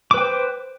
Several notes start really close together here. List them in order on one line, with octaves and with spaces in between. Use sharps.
D6 B4 G5 C5